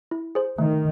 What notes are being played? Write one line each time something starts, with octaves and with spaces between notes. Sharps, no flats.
E4
G#4 C5
D#3 A3